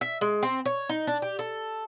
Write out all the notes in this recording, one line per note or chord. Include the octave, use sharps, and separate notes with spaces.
E5
G#3
C4
C#5
D#4
D4
G4
A4